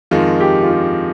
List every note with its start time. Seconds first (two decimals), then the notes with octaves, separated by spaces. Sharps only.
0.11 F2 D#3 G#3 F4
0.40 G4
0.63 F4
0.70 G4